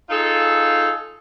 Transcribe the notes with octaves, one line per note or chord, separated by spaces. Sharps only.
D#4 F4 G#4 A4